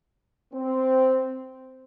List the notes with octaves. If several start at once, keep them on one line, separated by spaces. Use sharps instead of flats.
C4